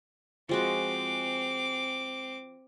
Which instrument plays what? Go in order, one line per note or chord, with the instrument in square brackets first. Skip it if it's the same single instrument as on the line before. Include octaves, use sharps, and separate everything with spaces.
[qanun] F3 G#3 F#4 [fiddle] C4 D6